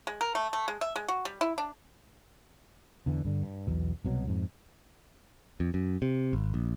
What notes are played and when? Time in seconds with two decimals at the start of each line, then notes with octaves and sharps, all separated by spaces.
0.07 G#3
0.21 A#4
0.35 A3
0.53 A3
0.68 G#3
0.81 E5
0.96 G#3
1.08 F#4
1.25 G3
1.41 E4
1.58 D4
3.06 E2 D3 E3
3.25 G2 D3
3.43 G2
3.67 B1 E2 B2
4.05 C2 B2 F#3
4.27 F2 G#2
5.60 F2
5.74 F#2
6.02 C3
6.33 G#1
6.54 A#1